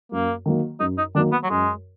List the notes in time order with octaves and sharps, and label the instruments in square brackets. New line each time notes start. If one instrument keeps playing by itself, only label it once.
[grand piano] F#2 [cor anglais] A#3
[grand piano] D#3 F#3 A#3
[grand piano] F#2 [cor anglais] D#4
[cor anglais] D#4
[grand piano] D#3 F#3 A#3 [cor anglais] D4
[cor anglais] B3
F#3
[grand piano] F#2 [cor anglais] G#3